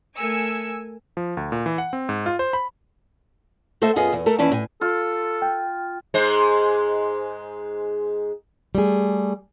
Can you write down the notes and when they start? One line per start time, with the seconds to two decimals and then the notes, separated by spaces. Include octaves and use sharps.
0.17 A3 A#4 G#5 E6 C#7
1.17 F3
1.37 D2
1.52 A#2
1.66 E3
1.78 F#5
1.93 C4
2.09 G#2
2.26 F4
2.39 C5
2.53 B5
3.82 A3 A4 C5 D#5 E5
3.96 F#2 B3 F4 G#4 D#5
4.13 E2
4.26 A3 A4 A#4
4.39 D#2 E3 C#4 E4 D5 A5
4.52 A2 G#5
4.81 F4 A4
5.42 G5
6.14 G#2 G#3 C5
8.75 G3 A3 G#4